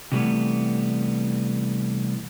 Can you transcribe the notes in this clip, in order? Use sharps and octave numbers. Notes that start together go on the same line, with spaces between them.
C3 E3 G3 A3 B3